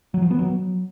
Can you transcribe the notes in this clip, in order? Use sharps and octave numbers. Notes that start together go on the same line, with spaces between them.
F#3
F3
B3
F#3